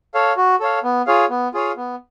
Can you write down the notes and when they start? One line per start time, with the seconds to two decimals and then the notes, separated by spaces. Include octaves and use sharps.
0.14 A4 C#5 F5
0.37 F#4
0.60 A4 C#5 F5
0.83 B3
1.07 F4 G#4 C#5 F5
1.30 B3
1.54 F4 G#4 C#5 F5
1.77 B3